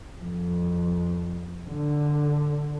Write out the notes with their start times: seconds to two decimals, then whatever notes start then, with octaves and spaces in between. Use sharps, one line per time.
0.20 F2
1.68 D3